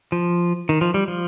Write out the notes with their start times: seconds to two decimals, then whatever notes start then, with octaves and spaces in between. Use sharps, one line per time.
0.12 F3
0.69 D#3
0.81 F3
0.94 G3
1.08 F3